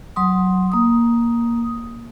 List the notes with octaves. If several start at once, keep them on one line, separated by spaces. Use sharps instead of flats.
F#3 C6 D#6
A#3 D#6